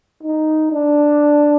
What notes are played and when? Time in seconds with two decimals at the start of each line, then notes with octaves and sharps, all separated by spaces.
0.23 D#4
0.72 D4